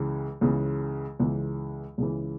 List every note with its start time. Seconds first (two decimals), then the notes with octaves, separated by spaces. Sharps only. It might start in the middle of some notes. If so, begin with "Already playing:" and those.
Already playing: C#2 C#3 E3
0.41 C#2 C#3 E3
1.20 C#2 C#3 E3
1.98 C#2 C#3 E3